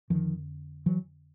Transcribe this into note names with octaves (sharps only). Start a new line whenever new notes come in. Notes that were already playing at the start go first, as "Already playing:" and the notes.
F2 D3 D#3 F3
E3 F#3